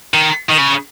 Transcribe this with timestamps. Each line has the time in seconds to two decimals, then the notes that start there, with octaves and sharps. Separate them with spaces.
0.14 D#3
0.50 D#3
0.58 C#3